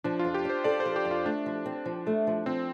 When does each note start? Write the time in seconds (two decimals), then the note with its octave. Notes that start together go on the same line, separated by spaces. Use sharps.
0.04 F3 D4
0.19 F4
0.24 F2
0.34 G4
0.45 D4 C5
0.64 A4 D5
0.80 C5
0.86 F3
0.96 G4
1.05 F2
1.11 F4
1.26 A3 D4
1.46 F3
1.66 C4
1.86 F3
2.07 A3
2.27 F3
2.46 F3 C4